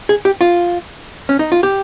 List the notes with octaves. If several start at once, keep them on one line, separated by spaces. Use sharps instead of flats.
G#4
G4
F4
C#4
D#4
F4
G4